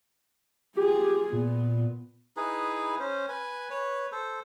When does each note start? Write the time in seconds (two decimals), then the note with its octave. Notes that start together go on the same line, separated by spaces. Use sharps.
0.77 F4 G4 G#4
1.33 A#2 B3
2.37 D#4 E4 G#4 B4
2.99 C#4 C5
3.29 B4 G#5
3.70 B4 C#5
4.12 A4 C5